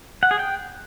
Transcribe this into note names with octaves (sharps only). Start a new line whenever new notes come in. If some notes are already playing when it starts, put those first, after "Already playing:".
F#5
G#4
G5